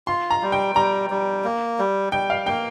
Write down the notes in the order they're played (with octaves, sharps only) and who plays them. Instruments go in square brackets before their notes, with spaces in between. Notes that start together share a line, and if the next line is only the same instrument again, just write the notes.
[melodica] F4 [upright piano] C6
[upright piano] A#5
[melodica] G3
[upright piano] G5
[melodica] G3 [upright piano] A#5
[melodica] G3
A#3
G3
[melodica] G3 [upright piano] G5
[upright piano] F5
[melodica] A#3 [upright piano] G5